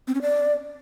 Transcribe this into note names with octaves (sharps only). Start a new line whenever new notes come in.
C4
C#4
D5